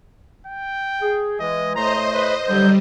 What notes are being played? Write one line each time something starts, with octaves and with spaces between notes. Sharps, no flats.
G5
G#4
E3 G#3 D#5
A2 A3 C5 D#5 A#5 C6
B4
D3 F#3 G3 G6